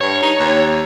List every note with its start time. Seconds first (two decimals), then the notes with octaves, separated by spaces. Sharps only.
0.01 G2 C#5
0.22 D#4
0.39 D#2